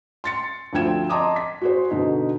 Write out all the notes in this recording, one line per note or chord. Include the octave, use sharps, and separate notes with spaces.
C6 A6 C#7
D2 F3 C4 G5 G#6 E7
D#5 A5 A#5 C6 D6 D#6
B6
F#4 G#4 C5
B2 D3 D#4